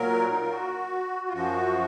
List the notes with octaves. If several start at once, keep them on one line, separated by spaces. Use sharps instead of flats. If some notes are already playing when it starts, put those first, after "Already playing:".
Already playing: A#2 F#3 A#4
D#4
F4
F#4
F4
F#2 F3 F#4